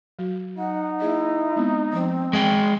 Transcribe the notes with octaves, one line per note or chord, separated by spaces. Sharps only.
F#3 F#4
D#4 F#5
A#3 E4 G#4 D#5
G#3 B3 C4
F3 C4 C5
G#3 G#4 G5